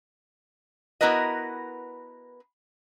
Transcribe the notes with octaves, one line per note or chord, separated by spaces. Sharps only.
B3 E4 F#4 A#4 B4 D#5